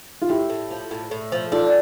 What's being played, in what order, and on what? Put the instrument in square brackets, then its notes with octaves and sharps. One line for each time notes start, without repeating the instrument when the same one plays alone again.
[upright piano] F4
[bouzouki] A2 [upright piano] E4 G4
[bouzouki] A2
F3
A2
A2
F3
[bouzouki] D4 [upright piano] F4 A4